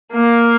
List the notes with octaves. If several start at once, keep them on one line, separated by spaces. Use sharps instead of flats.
A#3